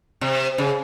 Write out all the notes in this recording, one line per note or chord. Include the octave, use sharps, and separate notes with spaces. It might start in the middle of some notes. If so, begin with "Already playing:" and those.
C3
C#3